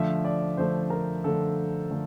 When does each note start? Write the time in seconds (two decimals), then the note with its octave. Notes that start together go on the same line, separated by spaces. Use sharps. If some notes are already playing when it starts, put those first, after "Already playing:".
Already playing: D3 F3 A3 E5
0.25 D5
0.57 D3 F3 A3 C5
0.90 A#4
1.24 D3 F3 A3 A4
1.90 D3 F3 A3